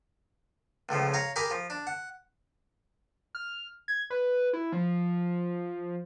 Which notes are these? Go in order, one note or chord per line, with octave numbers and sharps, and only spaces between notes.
C#2 A2 C#3 F3
C#5 F5 A#5
G4 G#4 A#4 G#5 B5 D6
F3
D4
F#5
F6
G#6
B4
E4
F3